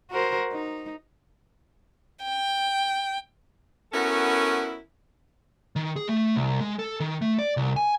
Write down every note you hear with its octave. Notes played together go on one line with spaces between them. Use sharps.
F#4 A#4 C5
D#4
G5
B3 C#4 E4 F#4 A4 A#4
D#3
G#4
A3
C2
G#3
A4
D#3
A3
D5
C2
G#5